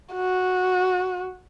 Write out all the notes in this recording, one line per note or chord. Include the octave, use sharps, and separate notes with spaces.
F#4